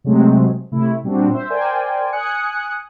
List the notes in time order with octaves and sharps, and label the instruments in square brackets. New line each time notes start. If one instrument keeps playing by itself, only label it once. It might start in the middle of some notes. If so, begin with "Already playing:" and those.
[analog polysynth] C3 F#3 G#3 A3 C4
C3 A3 E4
A#2 G3 C4 D4 F#4
C5 E5
A#4 C5 D5 G5 G#5
G#5 D#6 F#6 C#7